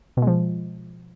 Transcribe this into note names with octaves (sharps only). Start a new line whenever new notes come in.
B2
G#3
F3